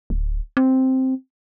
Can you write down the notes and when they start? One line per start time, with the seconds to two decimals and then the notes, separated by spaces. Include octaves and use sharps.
0.10 D1
0.57 C4